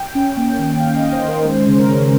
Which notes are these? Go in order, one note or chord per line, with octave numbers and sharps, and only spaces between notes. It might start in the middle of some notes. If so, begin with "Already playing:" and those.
Already playing: G5
C#4
A#3
D#3
C#4 F5
D#5
C#4
C5
D#3
A#4
G#3 C5
C#3
A#4
C#4